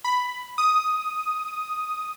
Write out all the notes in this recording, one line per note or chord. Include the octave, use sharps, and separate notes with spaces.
B5
D#6